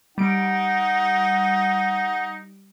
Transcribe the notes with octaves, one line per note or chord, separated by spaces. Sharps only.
G3 D#4 F#5 D7